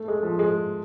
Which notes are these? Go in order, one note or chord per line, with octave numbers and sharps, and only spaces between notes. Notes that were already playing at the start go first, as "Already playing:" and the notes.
Already playing: A3
G#3
F3
G#3